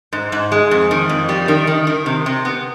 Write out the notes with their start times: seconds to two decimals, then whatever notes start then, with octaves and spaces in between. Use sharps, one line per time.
0.13 G#2
0.32 G#2
0.52 G#3
0.71 F2
0.91 D#3
1.09 F2
1.29 G3
1.48 D#3
1.67 D#3
1.87 D#3
2.06 C3
2.26 C3
2.45 B3